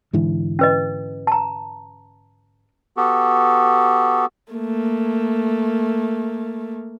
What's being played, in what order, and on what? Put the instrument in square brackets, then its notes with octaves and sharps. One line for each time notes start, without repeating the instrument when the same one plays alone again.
[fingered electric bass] G#2 D3 E3
[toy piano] C#4 B4 D#5
A5 A#5
[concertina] B3 F#4 G4 A4
[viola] A3 A#3